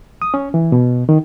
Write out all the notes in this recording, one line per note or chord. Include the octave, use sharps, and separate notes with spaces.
D#6
C#4
E3
B2
D#3